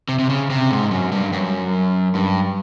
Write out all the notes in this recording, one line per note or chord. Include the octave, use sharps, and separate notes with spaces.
C3
C3
C#3
C3
G#2
F#2
G2
F#2
G2